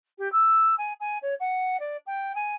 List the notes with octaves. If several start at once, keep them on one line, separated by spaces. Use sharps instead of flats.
G4
E6
G#5
G#5
C#5
F#5
D5
G5
G#5